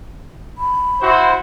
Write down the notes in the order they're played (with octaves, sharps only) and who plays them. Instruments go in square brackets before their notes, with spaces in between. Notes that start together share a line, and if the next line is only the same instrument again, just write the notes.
[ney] B5
[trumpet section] E4 F#4 C5